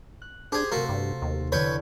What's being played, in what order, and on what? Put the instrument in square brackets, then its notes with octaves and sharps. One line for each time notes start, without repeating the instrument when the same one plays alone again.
[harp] F#6
[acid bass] D4 [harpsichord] G4 G#4 [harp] C5
[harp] C3 A3 [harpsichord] F4 F#4 [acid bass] A#4
[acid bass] G2
D#2
[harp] E2 D3 [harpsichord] B4 C#5 G5